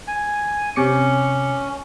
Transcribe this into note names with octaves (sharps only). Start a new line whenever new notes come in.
G#5
C3 C#4 D6 C#7